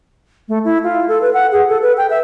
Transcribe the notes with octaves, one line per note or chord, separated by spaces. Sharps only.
A3
E4
F4
A4
B4
F#5
G#4
A4
B4
G5
E5